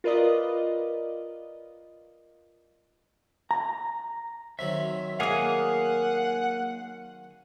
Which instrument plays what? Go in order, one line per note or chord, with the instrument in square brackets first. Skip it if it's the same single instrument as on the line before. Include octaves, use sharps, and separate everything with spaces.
[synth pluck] F4 A#4 B4 D5 D#5
[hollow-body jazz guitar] A#5
[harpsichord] D#3 F#3 C4 [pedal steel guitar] E5
[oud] A#3 G#4 [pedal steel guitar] F5 G#5 D#6 [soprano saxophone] F#5